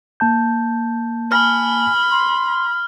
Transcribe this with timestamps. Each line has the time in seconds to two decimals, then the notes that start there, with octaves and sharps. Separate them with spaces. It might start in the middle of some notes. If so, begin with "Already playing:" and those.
0.20 A#3 A5 G6
1.32 G#5 B5 F6
2.11 C6